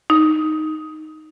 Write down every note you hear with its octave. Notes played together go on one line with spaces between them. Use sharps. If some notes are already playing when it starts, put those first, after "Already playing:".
D#4